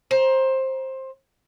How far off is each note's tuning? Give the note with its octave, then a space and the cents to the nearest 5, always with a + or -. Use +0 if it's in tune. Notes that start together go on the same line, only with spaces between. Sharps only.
C5 +15 A#5 +30